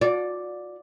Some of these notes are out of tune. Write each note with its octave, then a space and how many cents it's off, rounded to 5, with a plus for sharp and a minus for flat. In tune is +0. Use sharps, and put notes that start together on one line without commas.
F#4 -45 D5 +0